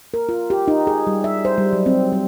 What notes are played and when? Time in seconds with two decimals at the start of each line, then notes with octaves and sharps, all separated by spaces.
0.14 A#4
0.29 F4
0.50 G4
0.68 D#4
0.87 G#4
1.07 G3
1.24 E5
1.45 C5
1.58 G3
1.73 F#3
1.86 C4
2.13 G3